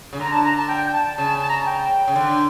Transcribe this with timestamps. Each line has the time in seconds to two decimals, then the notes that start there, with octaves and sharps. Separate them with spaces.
0.13 C#3
0.20 D3 A#5
0.32 A5
0.45 A#5
0.57 A5
0.69 G5
0.87 G5
0.93 A5
1.18 C#3 A5
1.42 A5
1.49 A#5
1.58 A5
1.67 G5
2.08 C#3
2.16 D3